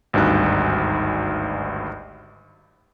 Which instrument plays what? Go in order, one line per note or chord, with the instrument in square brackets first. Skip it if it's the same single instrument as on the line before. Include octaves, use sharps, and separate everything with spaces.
[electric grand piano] G#1 D2 G2 D#4 F#6